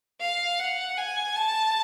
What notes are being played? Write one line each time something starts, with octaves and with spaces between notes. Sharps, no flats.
F5
F#5
G#5
A5